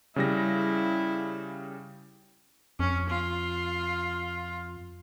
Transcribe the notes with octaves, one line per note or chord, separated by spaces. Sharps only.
C#3 G3 E4 A#6
F2 C#4
F4